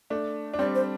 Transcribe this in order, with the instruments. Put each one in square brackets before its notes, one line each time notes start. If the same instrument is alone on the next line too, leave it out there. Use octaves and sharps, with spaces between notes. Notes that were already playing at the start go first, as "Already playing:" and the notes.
[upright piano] A3 D4
D4
[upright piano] G3 C4 [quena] D5
[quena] C5